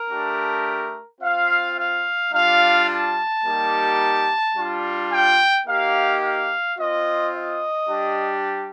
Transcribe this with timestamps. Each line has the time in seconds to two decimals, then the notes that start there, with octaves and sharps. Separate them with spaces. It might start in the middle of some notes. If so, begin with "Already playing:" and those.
Already playing: A#4
0.10 A3 D4 G4
1.21 C4 F4 F5
1.77 F5
2.33 G3 D4 F4 F5
2.89 A5
3.44 G3 A#3 D#4 G4
4.56 G3 D4 F4
5.11 G5
5.66 A#3 D#4 G4 F5
6.22 F5
6.78 C4 F4 D#5
7.34 D#5
7.89 G3 D4 G4